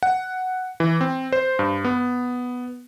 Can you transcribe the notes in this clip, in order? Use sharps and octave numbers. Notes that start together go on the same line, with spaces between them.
F#5
E3
C4
C5
G2
B3